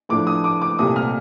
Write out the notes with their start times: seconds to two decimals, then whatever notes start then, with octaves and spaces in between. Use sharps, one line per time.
0.09 A2 F3 A3 D4 D6
0.27 D#6
0.44 D6
0.62 D6
0.79 C2 A#2 A3 C4 D#6
0.96 F6